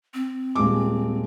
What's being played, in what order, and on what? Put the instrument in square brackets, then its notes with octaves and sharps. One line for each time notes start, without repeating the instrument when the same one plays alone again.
[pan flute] C4
[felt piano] D#1 G#3 D6